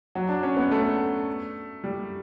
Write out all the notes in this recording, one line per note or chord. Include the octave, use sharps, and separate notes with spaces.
F#3
D4
C#4
B3
A3
G3